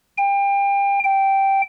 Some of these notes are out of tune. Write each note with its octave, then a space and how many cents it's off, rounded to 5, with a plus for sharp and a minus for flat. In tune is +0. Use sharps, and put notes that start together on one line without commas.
G5 +30
G5 -5